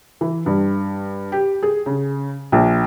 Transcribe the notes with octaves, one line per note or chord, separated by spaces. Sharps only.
E3
G2
G4
G#4
C#3
A#1